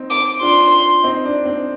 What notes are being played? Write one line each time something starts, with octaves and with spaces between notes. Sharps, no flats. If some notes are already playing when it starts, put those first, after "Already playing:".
Already playing: C4 D#4
D6
D4 F4 C6
C4 D#4
D4
C4